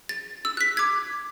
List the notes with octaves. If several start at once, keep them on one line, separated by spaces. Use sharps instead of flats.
A6
E6
F#6 B6
D6 G#6